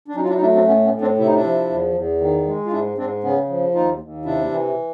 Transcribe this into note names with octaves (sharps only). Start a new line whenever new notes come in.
D4
F#3 C#4 D#4
F4
D4 E4
D#4
A3 D4 E4
C4 D4
A2 B3 C#4
B3 C#4
A2
C4 D4
C3 E4
D#4
D4 E4
F3
E2
E2
D#3
G#3
F4
G#2 D4 E4
G#2 C4 D4
C#3 B3 C#4
F3
D#2 D#4 F4
D#2
C3 D4 E4
E3